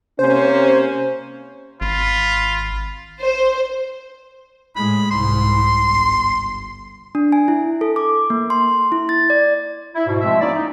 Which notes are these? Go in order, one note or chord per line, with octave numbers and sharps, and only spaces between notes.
C3 A#3 C#4 C5
G#1 F4 B5
C5
A2 G#3 B5
C2 G#2 C6
G1
D4
G#5
E4
A4
D6
A#3
C6
E4
A6
D5
E4
G#2 B2
F3 G#3 A3 C4 E5
A#3 C#4 D#4 E4 D5
D#4